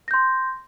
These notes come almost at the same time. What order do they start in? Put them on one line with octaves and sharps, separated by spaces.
A#6 G6 C6